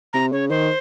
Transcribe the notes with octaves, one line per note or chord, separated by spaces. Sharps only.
C3 A#5
C#3 C#5
D#3 C5